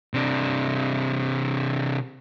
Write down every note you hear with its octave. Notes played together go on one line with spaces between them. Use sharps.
C3 D4